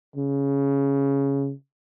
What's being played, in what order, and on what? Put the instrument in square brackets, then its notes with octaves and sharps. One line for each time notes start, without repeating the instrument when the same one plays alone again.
[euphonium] C#3